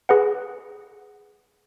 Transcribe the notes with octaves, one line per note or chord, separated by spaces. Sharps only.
G#4 B4 F#5